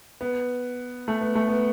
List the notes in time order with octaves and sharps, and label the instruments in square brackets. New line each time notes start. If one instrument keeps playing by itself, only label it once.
[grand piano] B3
A3
B3
A3
B3